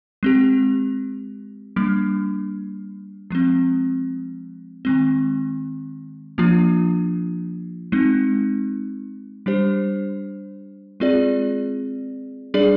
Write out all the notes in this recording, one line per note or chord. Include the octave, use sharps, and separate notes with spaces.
G#3 C4 G4
G3 A#3 D4
F3 G#3 C4
D#3 G#3 C4
F3 A#3 D4 F4
G#3 C4 D#4
G3 D4 G4 C5
G#3 C4 F4 G#4 D5
G3 D4 G#4 D5